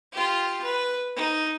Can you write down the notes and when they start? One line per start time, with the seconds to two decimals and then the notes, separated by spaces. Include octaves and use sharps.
0.12 F4 G4
0.62 B4
1.16 D#4